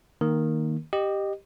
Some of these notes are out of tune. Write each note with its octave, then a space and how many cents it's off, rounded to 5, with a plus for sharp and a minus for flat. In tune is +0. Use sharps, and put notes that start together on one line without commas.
D#3 +0 A#3 +0 A#4 +0
G4 +0 D#5 -20